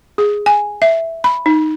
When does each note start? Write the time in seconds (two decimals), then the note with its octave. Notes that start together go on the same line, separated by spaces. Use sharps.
0.18 G#4
0.46 G#5
0.82 E5
1.24 B5
1.46 D#4